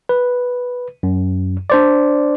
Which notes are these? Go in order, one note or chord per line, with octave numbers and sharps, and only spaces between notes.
B4
F#2
D4 C5 D5